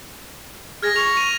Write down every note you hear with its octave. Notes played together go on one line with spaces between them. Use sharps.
G#4 F6 G#6 A#6
C#6 F7
D#7